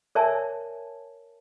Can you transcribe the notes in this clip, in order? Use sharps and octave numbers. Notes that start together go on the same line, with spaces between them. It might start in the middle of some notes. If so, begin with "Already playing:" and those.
A#4 C#5 D5 E5 G#5 A5